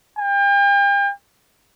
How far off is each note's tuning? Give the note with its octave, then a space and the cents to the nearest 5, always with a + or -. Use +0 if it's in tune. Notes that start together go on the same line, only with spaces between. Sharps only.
G5 +40